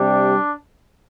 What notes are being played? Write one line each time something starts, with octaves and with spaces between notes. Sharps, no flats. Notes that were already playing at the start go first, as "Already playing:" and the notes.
Already playing: C3 G3 D4